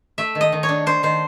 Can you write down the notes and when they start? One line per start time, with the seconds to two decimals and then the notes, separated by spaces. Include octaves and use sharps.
0.18 A3 E5
0.35 D#3
0.41 D#5
0.52 D#3
0.63 C#5
0.69 D4
0.86 D4 C5
1.03 D#3 C5